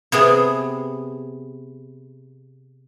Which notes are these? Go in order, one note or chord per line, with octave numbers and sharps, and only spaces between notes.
C3 B3 G#4